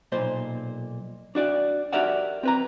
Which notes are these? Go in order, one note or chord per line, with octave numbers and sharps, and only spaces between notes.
B1 A#2 C5
D4 F#4 D5
F#4 G4 A#4 D5 E5 F#5
C4 B4 A#5